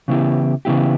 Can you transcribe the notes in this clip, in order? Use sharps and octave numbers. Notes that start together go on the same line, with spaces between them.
C#3 E3 B3 E4 G4
C#3 E3 B3 E4 G4